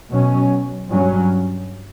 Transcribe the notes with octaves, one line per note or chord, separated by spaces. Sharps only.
B2 F#3 C#4
G2 F#3 C#4